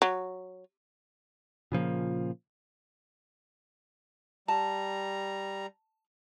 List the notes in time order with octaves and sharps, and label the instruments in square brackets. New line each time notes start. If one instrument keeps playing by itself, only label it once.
[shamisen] F#3
[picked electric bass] A#2 C#3 F3 A#3
[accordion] G3 A#5 [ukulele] A5